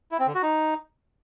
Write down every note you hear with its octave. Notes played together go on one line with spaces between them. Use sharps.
E4
C4
D3
F#4
D#4